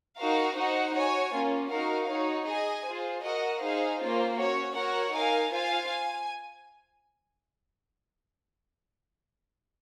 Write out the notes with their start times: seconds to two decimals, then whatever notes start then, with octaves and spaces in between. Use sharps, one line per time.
0.17 D#4 F#4 A#4 F5
0.56 D#4 F#4 C5 F#5
0.94 F#4 C#5 G#5
1.33 A#3 C#4 F4
1.70 D#4 F#4 A#4 F5
2.09 D#4 F#4 C#5
2.47 G#4 D#5 G#5
2.86 F4 G#4 C5
3.23 F#4 A#4 D#5 F#5
3.61 D#4 G#4 C5 F5
4.00 A#3 C#4 F4 C5
4.37 C#4 F#4 C#5
4.76 F#4 A#4 C#5 F#5
5.13 D#4 A#4 F5 G#5
5.52 F4 C5 F5 G#5
5.89 G#5